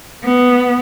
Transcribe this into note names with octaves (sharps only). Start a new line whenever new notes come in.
B3